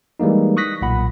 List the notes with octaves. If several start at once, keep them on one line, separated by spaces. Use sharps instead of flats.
E3 G3 G#3 A#3 D#4
C#6 D#6 F#6 A#6 B6
B1 A#2 F#5 B5